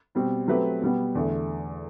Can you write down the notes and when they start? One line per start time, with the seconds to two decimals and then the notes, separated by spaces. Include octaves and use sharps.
0.15 B2 G3 C4
0.48 F#3 A3 C4 G4 B4
0.81 B2 G3 B3
1.15 E2 D3 A3